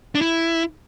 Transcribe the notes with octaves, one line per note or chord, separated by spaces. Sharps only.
D4
E4